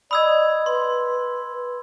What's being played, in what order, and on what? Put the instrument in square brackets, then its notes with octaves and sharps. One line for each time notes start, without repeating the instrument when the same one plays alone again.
[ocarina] D5 [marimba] D#5 D#6 [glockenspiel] B5 E6 G#6
[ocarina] B4 [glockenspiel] C6